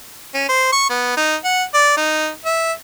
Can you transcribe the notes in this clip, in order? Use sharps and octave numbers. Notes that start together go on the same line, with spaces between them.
C#4
C5
C#6
B3
D#4
F#5
D5
D#4
E5